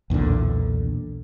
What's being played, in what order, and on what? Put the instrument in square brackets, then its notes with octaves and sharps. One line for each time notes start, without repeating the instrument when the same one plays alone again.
[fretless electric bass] B1 E2 A#2 D3